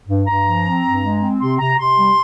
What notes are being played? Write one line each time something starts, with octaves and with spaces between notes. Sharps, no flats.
G2
G2 A#5
F3
C4
G2
G#3
C4
C3 C6
C3 A#5
C3 C6
G3